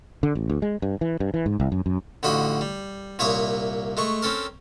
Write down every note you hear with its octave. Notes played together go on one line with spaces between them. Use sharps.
D3
A1
D2
G#3
G2
E3
G2
E3
G#2
C2
F#2
F#2
A1 D3 F3 F#4 D#5 B5
G3
C2 A#2 C#5 E5 C#6 D#6
G#3 A3 C#6
C4 C#4 A4 A#4